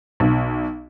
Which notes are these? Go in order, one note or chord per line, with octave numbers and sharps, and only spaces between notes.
B1